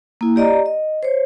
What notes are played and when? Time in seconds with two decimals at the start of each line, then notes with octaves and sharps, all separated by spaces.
0.21 A#3 E4
0.36 G4 D5 D#5 A#5
0.66 D#5
1.03 C5 C#5